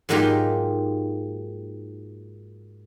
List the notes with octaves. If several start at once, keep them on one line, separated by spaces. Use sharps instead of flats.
G#2 F#3 A#3 D#4 F4 G4